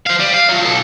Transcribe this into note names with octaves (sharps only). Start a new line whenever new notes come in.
C5 F5
G3
F5
F3 F#3
B1 A4